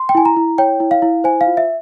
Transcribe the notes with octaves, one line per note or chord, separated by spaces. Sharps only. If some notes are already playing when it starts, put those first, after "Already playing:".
Already playing: C6
G5
E4 G#5
A#5
E4
C#5 G5
E4
F5
E4
C5 G#5
F5
F4
E5